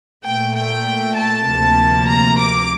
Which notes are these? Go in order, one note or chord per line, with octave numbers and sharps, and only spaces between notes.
A#2 A3 G5
G5
A5
D2 C3 F3 A#3
A#5
D6